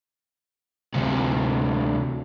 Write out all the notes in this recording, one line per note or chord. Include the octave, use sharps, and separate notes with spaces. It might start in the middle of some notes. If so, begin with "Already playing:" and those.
D2 C3